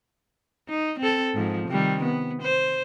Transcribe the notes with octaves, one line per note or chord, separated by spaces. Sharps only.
D#4
C4 A4
G#2 F3
C3 D#3 G3
B3
C5